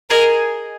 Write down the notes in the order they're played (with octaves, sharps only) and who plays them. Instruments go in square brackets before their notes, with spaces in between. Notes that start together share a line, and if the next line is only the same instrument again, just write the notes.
[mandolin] G#4 D#5 G#5 [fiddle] A#4